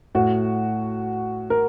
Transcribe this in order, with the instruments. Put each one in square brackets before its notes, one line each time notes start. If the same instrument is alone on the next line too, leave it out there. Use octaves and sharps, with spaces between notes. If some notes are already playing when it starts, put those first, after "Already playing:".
[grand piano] A2 F#4
A#4